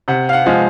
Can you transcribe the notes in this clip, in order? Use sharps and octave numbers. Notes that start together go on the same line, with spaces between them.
C3 F#5
F5
F#5
F3 G#3 F5